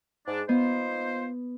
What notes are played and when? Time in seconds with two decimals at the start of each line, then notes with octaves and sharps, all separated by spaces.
0.27 G#2 D4
0.49 B3 D#4 F4 C5